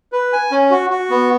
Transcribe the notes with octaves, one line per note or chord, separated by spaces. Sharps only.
B4
G#5
C#4
F#4
F#4
B3